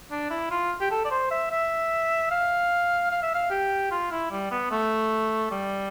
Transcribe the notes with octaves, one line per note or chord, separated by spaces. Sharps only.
D4
E4
F4
G4
A4
D5
C5
E5
E5
F5
F5
E5
F5
G4
F4
E4
G3
B3
A3
G3